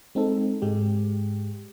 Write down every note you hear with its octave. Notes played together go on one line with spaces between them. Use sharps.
G#3 C4 D#4 A4
G#2 G#3 G4